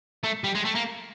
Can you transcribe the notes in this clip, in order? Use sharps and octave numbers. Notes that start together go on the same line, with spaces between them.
A3
G3
G#3
A3
A#3